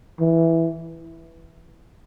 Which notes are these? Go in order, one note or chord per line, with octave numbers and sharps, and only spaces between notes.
E3